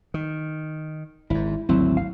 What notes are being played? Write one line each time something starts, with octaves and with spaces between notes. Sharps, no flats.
D#3
G#1 G#2 E4
G#1 D2 F#3 C4 E4
F5